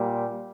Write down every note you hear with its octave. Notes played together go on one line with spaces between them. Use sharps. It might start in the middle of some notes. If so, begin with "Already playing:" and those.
Already playing: A#2 G3